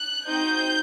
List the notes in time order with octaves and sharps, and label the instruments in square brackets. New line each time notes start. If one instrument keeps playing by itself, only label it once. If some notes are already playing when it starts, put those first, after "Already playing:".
Already playing: [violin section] F#6
C4 D#4 F#4 G6